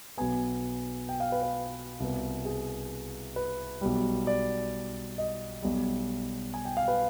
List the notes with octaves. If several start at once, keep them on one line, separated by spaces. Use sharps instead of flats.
B1 B2 B3 G#5
G5
F5
B4
B4
C2 B2 B3
G#4
B4
B1 B2 G3
D5
D#5
B1 B2 G3
G#5
G5
F5
B4